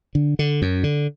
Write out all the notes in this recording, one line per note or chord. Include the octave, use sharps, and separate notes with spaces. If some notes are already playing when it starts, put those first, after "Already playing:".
D3
D3
F#2
D3